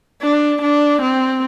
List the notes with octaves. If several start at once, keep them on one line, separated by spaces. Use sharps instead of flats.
D4
D4
C4